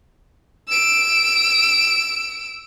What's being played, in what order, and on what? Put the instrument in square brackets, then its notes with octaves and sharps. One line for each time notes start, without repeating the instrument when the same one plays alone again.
[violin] E6 D7